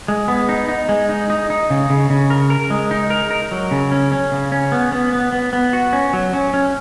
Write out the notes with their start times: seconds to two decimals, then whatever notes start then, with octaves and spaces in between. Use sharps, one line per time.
0.08 G#3
0.28 B3
0.49 D#4
0.69 D#4
0.89 G#3
1.09 D#4
1.30 D#4
1.50 D#4
1.70 C#3
1.90 C#3
2.10 C#3
2.30 A#4
2.50 A#4
2.70 G#3
2.91 D#4
3.10 A#4
3.31 A#4
3.52 F#3
3.71 C#3
3.92 C#4
4.12 C#4
4.32 C#3
4.52 C#4
4.72 B3
4.92 B3
5.13 B3
5.32 B3
5.53 B3
5.73 F#4
5.93 C#4
6.13 F#3
6.34 C#4
6.54 C#4